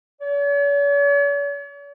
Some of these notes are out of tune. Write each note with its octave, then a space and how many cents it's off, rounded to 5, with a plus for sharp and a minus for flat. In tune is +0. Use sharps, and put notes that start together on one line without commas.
C#5 +45